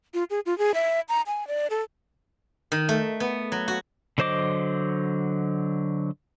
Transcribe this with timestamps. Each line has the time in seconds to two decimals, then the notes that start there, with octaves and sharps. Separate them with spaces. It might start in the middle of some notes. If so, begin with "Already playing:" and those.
0.14 F4
0.30 G#4
0.46 F4
0.58 G#4
0.74 E5
1.09 A#5
1.27 G#5
1.47 D5
1.70 A4
2.72 D#3
2.89 A3
3.20 B3
3.52 F#3
3.68 F#4
4.18 D3 F#3 C5 D#5 D6